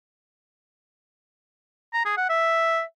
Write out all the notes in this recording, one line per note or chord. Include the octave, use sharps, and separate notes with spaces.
A#5
G#4
F#5
E5